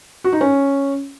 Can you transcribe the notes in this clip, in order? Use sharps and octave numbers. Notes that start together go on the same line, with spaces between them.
F#4
D#4
C#4